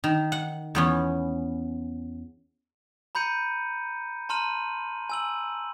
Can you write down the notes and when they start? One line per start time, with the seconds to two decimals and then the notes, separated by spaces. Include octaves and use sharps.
0.04 D#3
0.32 F#5
0.75 E2 B3 C#4
3.15 A#5 B5 G6 C#7 D#7
4.29 A5 A#5 C6 F6 D#7 F#7
5.10 G#5 E6 F#7